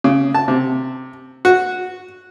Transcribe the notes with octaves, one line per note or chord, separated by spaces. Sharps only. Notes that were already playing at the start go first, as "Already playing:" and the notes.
C#3
A5
C3
F#4